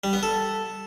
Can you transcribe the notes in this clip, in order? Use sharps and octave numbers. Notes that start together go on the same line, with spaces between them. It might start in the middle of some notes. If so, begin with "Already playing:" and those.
G3
B3
A4